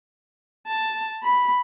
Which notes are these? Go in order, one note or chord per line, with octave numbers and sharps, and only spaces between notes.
A5
B5